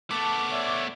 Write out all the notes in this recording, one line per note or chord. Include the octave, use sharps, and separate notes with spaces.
A3 B3 A5 D6
C#5 D5 E5